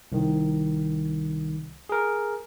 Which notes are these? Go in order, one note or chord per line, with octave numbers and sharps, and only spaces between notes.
C2 D#3
G#4 A#4